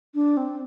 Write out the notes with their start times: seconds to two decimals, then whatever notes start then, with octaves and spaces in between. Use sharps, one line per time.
0.14 D4
0.37 C4